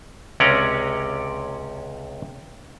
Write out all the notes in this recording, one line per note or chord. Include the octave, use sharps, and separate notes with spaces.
C#2 C3 C#4 D5 A#5